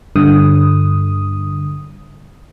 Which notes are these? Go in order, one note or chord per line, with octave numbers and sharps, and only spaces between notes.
G2 D3 D#6